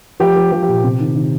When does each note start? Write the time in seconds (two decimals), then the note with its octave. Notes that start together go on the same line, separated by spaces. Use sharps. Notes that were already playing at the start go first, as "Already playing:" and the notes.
0.20 F3 G4
0.36 F3
0.51 F3 G4
0.63 G4
0.68 A#2
0.84 C3
1.00 D#3
1.16 D#3